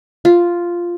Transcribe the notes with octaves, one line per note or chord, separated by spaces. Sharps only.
F4